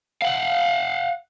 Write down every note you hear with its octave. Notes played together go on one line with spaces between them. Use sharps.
F5 F#5